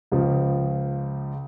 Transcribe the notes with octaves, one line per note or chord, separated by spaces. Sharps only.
C#2 C#3 F3